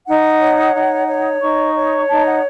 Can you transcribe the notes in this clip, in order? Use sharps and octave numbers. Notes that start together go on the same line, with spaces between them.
D#4 F#5
C#5
D#4
C#5
D#4 C#6
C#5
D#4 A5
F#5